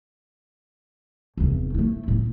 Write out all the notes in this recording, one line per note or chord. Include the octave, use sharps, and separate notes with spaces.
F1 E2
A3 E4
A#2